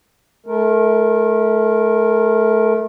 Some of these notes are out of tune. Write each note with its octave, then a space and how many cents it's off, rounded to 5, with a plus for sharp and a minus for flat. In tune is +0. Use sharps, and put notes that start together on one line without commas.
A3 -25 A#4 +0